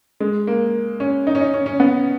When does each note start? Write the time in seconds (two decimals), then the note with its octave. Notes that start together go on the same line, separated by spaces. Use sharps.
0.20 G#3
0.47 A#3
1.00 C#4
1.27 D#4
1.35 C#4
1.41 D#4
1.54 C#4
1.66 C#4
1.80 B3